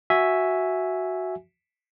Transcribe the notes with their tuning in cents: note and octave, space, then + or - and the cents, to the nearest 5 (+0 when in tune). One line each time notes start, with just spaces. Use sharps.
F#4 +0 E5 +0 G#5 +0